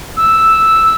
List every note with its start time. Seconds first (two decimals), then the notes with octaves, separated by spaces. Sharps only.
0.17 E6